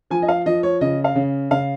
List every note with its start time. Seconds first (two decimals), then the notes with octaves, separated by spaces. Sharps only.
0.11 F3 G#5
0.22 D#5
0.28 F5
0.46 F3 D#5
0.63 C#5
0.81 C#3 D#5
1.04 F5
1.15 C#3
1.51 C#3 F5